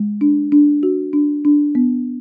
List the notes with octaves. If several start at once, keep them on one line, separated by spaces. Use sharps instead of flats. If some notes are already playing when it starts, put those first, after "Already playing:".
Already playing: G#3
D4
D4
F#4
D4
D4
B3